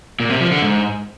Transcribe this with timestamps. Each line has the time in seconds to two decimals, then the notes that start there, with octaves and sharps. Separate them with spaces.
0.20 A#2
0.30 C3
0.41 F3
0.52 D3
0.62 G#2